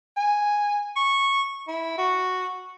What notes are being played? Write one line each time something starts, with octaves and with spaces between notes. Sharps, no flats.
G#5
C#6
E4
F#4